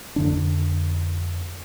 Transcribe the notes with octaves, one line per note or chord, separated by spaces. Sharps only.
F2 D3 D4